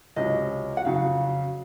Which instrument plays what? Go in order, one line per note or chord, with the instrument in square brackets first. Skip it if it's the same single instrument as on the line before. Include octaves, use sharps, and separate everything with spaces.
[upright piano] C#2 C3 F#3 C#4 [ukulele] D#5
[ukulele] F#5
[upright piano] F2 C#3 F#3 [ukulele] F5